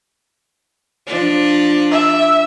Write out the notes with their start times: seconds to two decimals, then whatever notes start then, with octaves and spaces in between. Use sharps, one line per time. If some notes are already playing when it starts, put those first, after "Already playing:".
1.07 F3 D4
1.91 E5